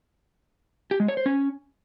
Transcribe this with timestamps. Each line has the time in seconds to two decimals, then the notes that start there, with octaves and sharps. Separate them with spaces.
0.91 G4
1.00 G#3
1.08 C#5
1.17 C5
1.26 C#4